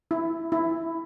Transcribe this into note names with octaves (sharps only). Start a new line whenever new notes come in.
E4
E4